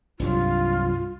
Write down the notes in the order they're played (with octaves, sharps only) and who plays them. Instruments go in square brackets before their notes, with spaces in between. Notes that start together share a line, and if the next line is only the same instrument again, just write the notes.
[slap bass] C2 G2 F#3 [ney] F4